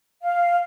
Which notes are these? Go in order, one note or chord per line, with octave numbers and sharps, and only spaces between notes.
F5